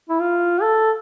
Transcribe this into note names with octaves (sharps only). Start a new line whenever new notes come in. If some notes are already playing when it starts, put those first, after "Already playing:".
E4
F4
A4